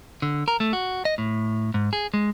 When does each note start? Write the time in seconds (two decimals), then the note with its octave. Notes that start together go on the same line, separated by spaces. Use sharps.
0.22 D3
0.48 A#4
0.60 A3
0.73 F#4
1.05 D#5
1.18 A2
1.74 G#2
1.93 G#4
2.14 G#3